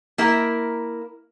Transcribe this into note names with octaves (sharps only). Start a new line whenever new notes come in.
A#3 E4 A#4